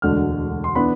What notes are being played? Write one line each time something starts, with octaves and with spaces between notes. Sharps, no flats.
E1 D2 D3 G#3 D4 F6
C6
E3 B3 D4 B5